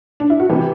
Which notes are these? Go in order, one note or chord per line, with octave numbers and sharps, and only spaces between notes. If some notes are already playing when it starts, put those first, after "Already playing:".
D4
E4
F#4
C3 E3 G4